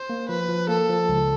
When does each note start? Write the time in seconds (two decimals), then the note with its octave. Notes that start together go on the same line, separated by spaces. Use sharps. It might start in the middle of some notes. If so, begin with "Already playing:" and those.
Already playing: C5
0.10 A#3
0.29 F3 B4
0.49 F3
0.68 A#3 A4
0.89 F3
1.09 C#2